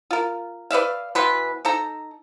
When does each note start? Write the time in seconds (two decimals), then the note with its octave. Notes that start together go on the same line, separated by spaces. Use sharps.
0.11 F4 A#4
0.71 B4 D5 E5 F5
1.15 B2 E3 B4 C6
1.65 D#4 A4 A#5